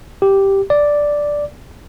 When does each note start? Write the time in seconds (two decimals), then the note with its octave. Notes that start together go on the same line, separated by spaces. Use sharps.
0.22 G4
0.70 D5